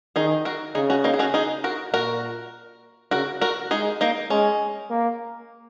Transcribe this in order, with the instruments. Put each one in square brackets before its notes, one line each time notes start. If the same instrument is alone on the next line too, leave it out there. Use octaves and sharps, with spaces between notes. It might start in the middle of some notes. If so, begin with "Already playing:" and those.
[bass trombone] D#3 [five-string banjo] D#4 G#4
[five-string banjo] F#4 A#4
[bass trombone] C#3 [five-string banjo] D#4 G#4
[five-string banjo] C#4 F#4
A#3 D#4
G#4
C#4 F#4
D#4 G#4
F#4 A#4
[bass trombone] A#2 [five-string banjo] F#4 A#4
[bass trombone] C#3 [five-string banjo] F#4 A#4
[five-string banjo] F#4 A#4
[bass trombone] G#3 [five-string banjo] D#4 G#4
[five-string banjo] A#3 D#4
[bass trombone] G#3 [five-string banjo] C#4
[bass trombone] A#3